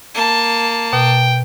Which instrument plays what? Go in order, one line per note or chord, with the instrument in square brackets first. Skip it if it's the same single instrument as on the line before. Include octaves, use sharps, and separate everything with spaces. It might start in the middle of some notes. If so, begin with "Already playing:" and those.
[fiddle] A#3 A5
[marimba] B2 [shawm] G5